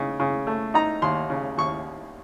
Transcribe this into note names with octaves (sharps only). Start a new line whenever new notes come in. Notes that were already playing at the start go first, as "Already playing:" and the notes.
Already playing: C#3 D#4
C#3
A3
D#4 A#5
D#2 C6
C#3
D#2 C#6